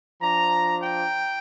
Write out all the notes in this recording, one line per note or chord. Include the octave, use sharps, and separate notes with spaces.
F3 D4 A#5
G5